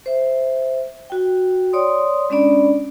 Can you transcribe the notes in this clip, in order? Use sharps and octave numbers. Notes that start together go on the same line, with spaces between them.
C5 E5
F#4 G5
C#5 D5 C6 D#6
G#3 C#4 D4 D5 B5